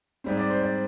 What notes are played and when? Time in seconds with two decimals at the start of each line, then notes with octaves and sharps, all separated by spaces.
0.24 G#2 G3 C4
0.37 D5
0.50 C5
0.62 D5